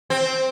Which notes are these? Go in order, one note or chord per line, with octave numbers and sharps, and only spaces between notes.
C4